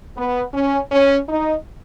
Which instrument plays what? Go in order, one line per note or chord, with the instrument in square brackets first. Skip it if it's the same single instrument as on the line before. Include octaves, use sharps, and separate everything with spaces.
[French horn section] B3
C#4
C#4
D#4